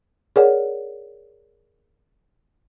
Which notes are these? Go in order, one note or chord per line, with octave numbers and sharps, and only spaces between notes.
G#4 A#4 C#5 D5 F#5